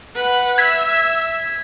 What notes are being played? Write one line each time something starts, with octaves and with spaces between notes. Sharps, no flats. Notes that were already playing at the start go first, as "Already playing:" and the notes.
B4 F#5
E5 G#6 B6